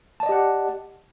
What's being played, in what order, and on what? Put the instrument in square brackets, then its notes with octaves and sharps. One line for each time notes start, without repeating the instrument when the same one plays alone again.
[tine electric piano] A5
D5
D#5
G4
F#5